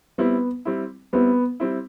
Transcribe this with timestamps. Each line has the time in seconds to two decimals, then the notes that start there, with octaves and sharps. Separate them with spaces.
0.18 G3 B3 C4 E4
0.65 G3 C4 E4
1.13 G3 B3 C4 E4
1.60 G3 C4 E4